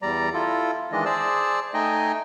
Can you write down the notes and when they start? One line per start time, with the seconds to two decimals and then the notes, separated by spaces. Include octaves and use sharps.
0.02 E2 G3 D5 A#5
0.34 E4 F4 A4
0.92 D#3 E3 G#3 D4 D#5
1.05 G#4 C5 D5 A5 E6
1.74 A3 D#4 D#5 G5 G#5